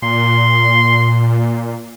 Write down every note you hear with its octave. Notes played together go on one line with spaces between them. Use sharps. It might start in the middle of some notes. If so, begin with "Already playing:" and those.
A#2 C6